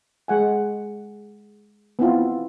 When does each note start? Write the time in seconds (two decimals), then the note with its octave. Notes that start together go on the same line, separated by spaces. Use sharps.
0.28 G#3 F#5 G#5
1.99 B3 C4 E4 F4